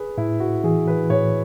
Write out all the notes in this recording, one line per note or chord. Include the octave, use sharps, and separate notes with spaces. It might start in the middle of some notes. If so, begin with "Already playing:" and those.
Already playing: G#4 B4
A2 E4
F#4
E3 G#4
B4
A2 C#5